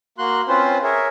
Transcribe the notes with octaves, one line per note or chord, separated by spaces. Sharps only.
A#3 F#4 C6 F#6
C4 C#4 F4 B4 C5
G#4 A#4 C#5 E5